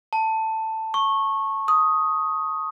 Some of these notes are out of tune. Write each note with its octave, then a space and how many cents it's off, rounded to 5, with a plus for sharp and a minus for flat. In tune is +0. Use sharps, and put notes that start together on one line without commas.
A5 +10
C#6 -15
D#6 +10